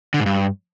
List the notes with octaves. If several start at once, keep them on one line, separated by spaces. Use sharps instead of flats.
D3
G#2
G2